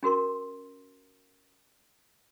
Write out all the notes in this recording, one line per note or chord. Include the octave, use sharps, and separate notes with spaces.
C#4 F#4 A#4 C6